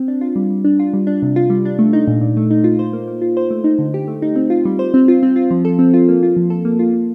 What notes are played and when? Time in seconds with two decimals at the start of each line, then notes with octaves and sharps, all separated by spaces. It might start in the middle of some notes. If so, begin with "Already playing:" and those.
Already playing: C4
0.08 D4
0.21 F4
0.36 G3
0.50 G3
0.65 D4
0.79 F4
0.94 G3
1.07 D4
1.22 C3
1.36 F4
1.50 G3
1.65 D4
1.79 A3
1.93 D#4
2.08 A#2
2.22 A#2
2.37 A3
2.51 D#4
2.64 F4
2.79 C5
2.93 A#3
3.08 A#3
3.22 F4
3.37 C5
3.51 A3
3.64 D#4
3.79 D3
3.94 G4
4.08 A3
4.22 D#4
4.36 C4
4.50 F4
4.65 G3
4.79 C5
4.94 C4
5.08 F4
5.23 C4
5.36 F4
5.51 F3
5.65 A4
5.79 C4
5.94 F4
6.08 A#3
6.23 F4
6.37 F3
6.50 A4
6.65 A#3
6.79 F4
6.93 A#3